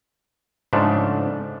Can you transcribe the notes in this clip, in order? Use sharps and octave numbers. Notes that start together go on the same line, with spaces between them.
G#2 C#3 F3 A3 D4